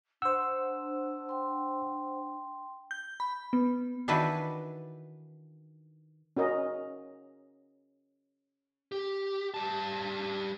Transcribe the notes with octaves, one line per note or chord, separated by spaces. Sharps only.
D4 C5 F#5 E6
G5 C6
G6
B5
B3
D#3 E3 D4 E4 F#4 B4
C#4 F#4 A#4 D#5
G4
G3 A5